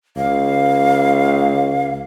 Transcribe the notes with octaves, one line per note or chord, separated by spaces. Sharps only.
C#2 F5